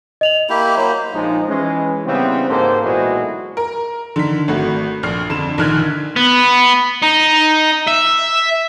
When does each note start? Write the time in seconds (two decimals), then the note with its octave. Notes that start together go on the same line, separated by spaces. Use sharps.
0.21 D#5 F7 F#7
0.49 A#3 E4 G4
0.77 F#3 A#3 C5
1.13 A#1 F3 G#3 D#4
1.48 E3 G#3 C#4
2.06 C#3 E3 G3 B3 C4
2.49 G#2 A#3 G4 A4 C5
2.83 B1 A#2 E3 G#3 E4 F#4
3.57 A#4
4.16 D3 D#3 B6
4.48 G#1 A3 F#4
5.03 A#1 F6 C7
5.30 F2 D3 E7
5.58 A#1 D3 D#3 F6 F#6 G#6
6.16 B3
7.03 D#4
7.87 E5